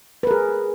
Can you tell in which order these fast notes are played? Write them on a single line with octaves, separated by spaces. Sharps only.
B4 A#4 G#4